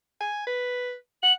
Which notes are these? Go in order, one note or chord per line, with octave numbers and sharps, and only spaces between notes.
G#5
B4
F#5 F#7